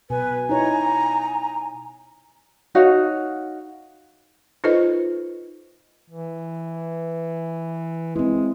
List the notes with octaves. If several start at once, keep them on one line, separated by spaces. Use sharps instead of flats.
B2 B4 G#5
D#4 E4 C#5 A#5
D#4 F#4 C#5 F5
D#4 F4 A4 B4 C5 D#5
E3
G#3 C4 E4